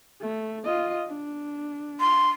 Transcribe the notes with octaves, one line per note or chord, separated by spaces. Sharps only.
A3
F4 D#5
D4
C6